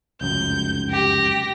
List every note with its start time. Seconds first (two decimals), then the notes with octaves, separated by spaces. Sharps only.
0.21 F1 C#2 F#2 G6
0.90 G4 A#6